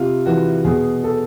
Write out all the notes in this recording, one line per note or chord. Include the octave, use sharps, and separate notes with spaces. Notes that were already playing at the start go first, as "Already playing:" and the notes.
Already playing: C3 F4
E3 F#4
B2 G#4
A4